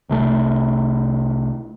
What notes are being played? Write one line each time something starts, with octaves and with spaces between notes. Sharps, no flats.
C2 C3 A3